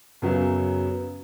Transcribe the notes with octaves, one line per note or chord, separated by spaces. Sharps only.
F#2 C#3 F#3 B3